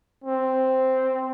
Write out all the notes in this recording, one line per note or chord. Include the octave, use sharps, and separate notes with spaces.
C4